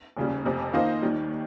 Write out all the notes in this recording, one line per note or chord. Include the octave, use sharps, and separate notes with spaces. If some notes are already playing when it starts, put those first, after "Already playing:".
F1 D#2 C#3 G3
F1 F2 C3
D#3 A#3 F4 C5 D#5
D#2 D#3 G3